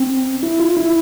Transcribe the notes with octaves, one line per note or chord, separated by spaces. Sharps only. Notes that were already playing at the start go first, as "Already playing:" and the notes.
Already playing: C4
E4
F4
E4